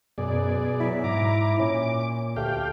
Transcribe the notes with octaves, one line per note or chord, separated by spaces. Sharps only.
F#2 B2 G#4 D5
F#3 E4
G#2 A#5 D6
A#2 C#4 D6
D2 A3 G4 F5 G5